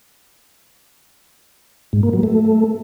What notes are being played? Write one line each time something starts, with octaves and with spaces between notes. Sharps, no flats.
G#2
A#3
F#3
A3